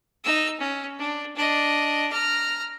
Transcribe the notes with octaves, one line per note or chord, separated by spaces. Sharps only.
D#4 E6
C#4
D4
D4 D#5
A#5 F6